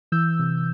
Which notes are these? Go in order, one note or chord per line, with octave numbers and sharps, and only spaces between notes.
E3 E6 G6
C3